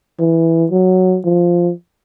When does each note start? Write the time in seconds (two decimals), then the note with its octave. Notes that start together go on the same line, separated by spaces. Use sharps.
0.19 E3
0.71 F#3
1.25 F3